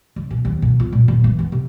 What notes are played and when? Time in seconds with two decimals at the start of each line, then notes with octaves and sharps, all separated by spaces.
0.16 C#3
0.31 B2
0.45 D#2
0.62 B2
0.80 F4
0.92 A#2
1.08 D#1
1.24 E3
1.39 B3
1.52 C3